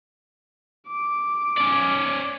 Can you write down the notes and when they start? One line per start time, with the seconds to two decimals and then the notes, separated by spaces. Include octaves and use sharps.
0.88 D6
1.58 C#4 D5